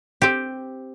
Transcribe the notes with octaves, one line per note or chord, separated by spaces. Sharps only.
C4 G4